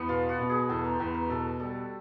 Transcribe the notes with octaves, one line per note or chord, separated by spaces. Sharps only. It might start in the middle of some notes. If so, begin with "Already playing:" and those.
Already playing: E2 B3
B2 F4
F#4
B2
G#4
E2 A4
A#4
C5
E2 B4
A#4
B2 A4
G3 A4